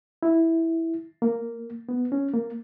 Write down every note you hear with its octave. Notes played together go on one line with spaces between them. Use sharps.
E4
A#3
B3
C#4
A#3